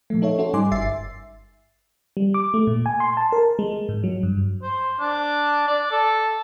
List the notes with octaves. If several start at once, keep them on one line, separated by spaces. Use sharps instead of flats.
A#2 F3 A3
D#4 A4 C#5 E5
C#4 F#4 A4 C5 C#5
G#2 G3 D#4 G#5 C6 D6
G1 E5 A6 C7
G3
D6
A3
A#2
G#5
C6
A5
A#4
G#3
G#2
F#3
G2
C5
D4
D5
A4